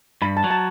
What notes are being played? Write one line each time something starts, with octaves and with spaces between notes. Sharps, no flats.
G2 B5
A5
F#3
A5